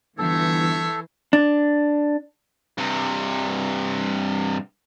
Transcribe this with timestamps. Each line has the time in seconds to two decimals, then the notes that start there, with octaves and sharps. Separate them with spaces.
0.18 G1 E3 A4 C5 C#5 E5
1.33 D4
2.78 G2 C3